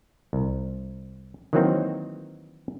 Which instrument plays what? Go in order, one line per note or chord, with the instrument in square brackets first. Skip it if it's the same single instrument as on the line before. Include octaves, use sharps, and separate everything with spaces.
[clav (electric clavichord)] C2
D#3 E3 F#3 A#3 C4 D#4